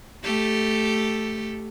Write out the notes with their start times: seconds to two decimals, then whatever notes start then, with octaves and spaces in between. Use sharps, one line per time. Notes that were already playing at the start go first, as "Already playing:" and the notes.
0.24 A3 G4 A4